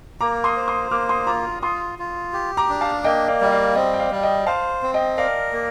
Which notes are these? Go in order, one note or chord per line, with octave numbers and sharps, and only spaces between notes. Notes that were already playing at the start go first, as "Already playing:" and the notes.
A#3 A#5 D6
C6 D#6
C5
C6 D#6
A#3 D6 F6
C6 D#6
F4 A#5 D6
F4 C6 D#6
F4
G4
A#5 D6
D4
F5 A5
A#3 D#5 G5
D5 F5
G3 D#5
D5 F5
C4 D#5 G5
G5
D5 F5
G3
D#5 G5
C5 F5 A5
C4
D#5 G5
A#4 D5 F5
A#3